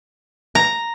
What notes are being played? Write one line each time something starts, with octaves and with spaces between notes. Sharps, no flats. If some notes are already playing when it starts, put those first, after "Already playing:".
A#5